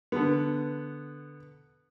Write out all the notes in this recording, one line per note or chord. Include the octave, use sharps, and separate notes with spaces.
D3 B3